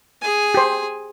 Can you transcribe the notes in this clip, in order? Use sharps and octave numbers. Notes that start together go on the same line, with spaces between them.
G#4 G#5
G4 C5